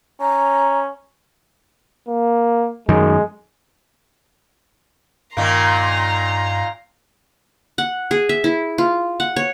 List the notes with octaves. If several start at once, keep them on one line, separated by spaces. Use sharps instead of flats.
C#4 A#5
A#3
F#2 D#3 G#3
G2 A#2 D#3 A#3 A#5 C6
F#5
G#4
E5
E4
F4
F#5
C#5